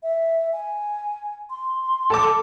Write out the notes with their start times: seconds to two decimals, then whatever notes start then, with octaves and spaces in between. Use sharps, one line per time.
0.03 E5
0.52 G#5
1.50 C6
2.10 A4 A5 D6